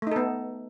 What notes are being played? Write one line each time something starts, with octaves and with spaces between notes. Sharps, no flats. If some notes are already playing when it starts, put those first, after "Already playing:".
A3 B3 D#4 A4